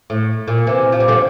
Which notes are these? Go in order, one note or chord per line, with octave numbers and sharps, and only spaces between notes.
A2
A#2
C3 E3
F3
G3
D3 F3